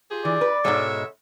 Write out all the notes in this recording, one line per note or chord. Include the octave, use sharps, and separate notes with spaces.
F4 G4 G#4
E3 D5
B4
G#2 B2 G#3 A4 C#5 E5